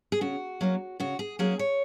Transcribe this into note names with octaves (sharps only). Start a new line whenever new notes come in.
G#4
C#3 F#4
F#3 A#3 C#4
C#3 F#4
G#4
F#3 A#3 C#4 G#4
C#5